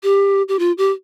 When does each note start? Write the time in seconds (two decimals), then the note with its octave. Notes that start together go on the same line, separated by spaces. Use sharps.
0.03 G4
0.48 G4
0.59 F4
0.78 G4